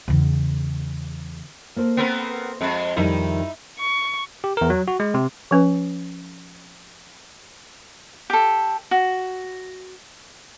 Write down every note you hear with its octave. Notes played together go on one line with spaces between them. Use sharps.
E2 C#3
A#3 A4 C5
B3 C4 A#4
F2 G#3
F2 D#3 G3 D#4 E4
C#6
G4
E2 A#4
F#3
F#4
G#3
C3
F3 C#4 B4
G4 A4
F#4